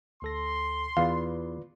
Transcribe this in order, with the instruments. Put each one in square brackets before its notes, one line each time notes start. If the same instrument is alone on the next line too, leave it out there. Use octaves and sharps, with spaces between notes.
[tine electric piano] D2 A4 A#6 [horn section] C6
[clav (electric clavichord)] E2 [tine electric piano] F4 B4 D5 [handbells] F5